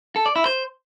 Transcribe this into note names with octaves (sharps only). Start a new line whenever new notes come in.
A4
D5
E4
C5